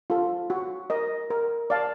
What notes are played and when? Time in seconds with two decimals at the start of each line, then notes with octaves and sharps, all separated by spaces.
0.10 F4 A4
0.50 F#4
0.90 A#4 D#5
1.30 A#4
1.70 D5 F5 A5